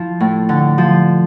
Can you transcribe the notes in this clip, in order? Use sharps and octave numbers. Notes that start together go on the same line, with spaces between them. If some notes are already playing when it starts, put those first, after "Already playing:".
Already playing: F3 E4
A2
D3
F3